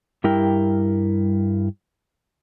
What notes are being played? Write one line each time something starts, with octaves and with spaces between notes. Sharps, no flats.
G2 G3 E4 A#4 G5